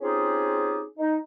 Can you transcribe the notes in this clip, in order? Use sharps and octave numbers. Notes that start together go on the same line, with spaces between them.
C4 C#4 D#4 F4 G4 G#4
D#4